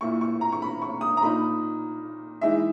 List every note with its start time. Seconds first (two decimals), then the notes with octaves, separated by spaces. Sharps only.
0.01 A#2 A#3 E4 C#6
0.21 C#6
0.41 A#5
0.52 C#6
0.62 B5
0.82 C#6
1.01 D#6
1.17 A#5
1.22 A#2 A#3 D#4 B5
2.41 E3 G#3 D#4 E5